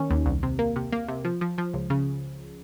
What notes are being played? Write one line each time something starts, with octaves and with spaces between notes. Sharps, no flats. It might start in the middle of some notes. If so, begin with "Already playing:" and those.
Already playing: D#3 A#3 C#4
D#2
C2
C3
A#3
C3
A#3
C3
F3
F3
F3
C#2
C#3